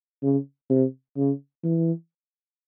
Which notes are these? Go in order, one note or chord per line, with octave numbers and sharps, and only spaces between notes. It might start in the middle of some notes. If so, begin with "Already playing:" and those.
C#3
C3
C#3
E3